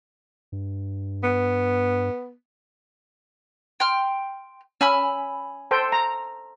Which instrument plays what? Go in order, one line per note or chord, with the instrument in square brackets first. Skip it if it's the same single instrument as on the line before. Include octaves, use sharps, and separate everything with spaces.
[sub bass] G2
[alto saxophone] B3
[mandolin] G5 C6 F6
[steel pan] C#4 [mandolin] G#5 B5 E6
[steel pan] A4 C5 G5
A#5